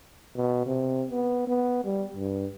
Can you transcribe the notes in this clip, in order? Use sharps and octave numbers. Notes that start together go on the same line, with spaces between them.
B2
C3
B3
B3
G3
G2